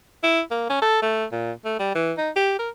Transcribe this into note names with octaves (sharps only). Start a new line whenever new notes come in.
E4
A#3
C#4
A4
A3
A#2
A3
G3
E3
D#4
G4
A#4